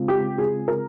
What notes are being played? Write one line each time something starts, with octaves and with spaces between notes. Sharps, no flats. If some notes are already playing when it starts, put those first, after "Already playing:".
Already playing: C#3 G#3 C4 F4
G4
G#4
A#4